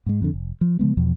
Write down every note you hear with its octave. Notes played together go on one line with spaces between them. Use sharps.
G#2 G#3
F2 D3
F1
F3
C#3 F3 G#3 B3
E2 B2 F3